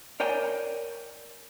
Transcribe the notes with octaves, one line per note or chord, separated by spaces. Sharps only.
A#4 C#5 D5 G5 G#5 A#5